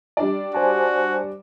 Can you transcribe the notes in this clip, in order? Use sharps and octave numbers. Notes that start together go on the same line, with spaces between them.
G3 D4 D5
F#4 C5 G#5 A5